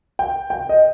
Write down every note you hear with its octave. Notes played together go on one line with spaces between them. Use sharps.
G5
G5
D#5